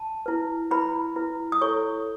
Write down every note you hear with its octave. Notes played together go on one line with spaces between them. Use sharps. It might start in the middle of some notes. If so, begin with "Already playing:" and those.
Already playing: A5
E4 B4
E4 B4 B5
E4 B4
D#6
E4 A4 C#5 C#6